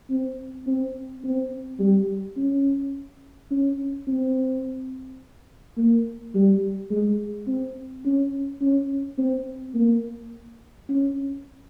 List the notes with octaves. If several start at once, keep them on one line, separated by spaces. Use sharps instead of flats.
C4
C4
C4
G3
C#4
C#4
C4
A#3
G3
G#3
C4
C#4
C#4
C4
A#3
C#4